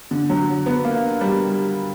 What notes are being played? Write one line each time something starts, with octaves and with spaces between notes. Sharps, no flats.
D3
F#3
B3
A#3
G3